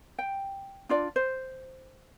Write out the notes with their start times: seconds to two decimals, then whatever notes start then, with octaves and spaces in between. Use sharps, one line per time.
0.19 G5
0.89 D4 F4 D5
1.16 C5